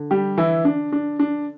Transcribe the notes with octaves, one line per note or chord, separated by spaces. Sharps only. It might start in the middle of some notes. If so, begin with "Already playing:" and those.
Already playing: D3
G3 G4
E3 E4
D4
D4
D4